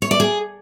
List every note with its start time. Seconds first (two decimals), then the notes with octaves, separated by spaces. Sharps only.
0.02 C#5
0.11 D5
0.20 G#4